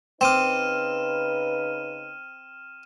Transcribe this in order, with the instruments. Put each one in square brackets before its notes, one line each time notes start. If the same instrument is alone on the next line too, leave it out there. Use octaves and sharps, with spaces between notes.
[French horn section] C#3 D#4 B4 [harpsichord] C4 D6 [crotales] F6 D#7 E7